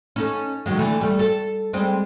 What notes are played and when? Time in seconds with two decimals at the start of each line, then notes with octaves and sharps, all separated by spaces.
0.16 C#4 D#4 A4
0.66 D#3 F#3 G#3
0.77 D3 E3 A3
1.01 G3 A3
1.19 A4
1.73 G3 G#3 C4